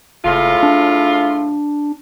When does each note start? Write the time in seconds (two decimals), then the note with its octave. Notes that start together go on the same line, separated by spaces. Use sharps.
0.25 F#1 A2 C#3 F4
0.63 D4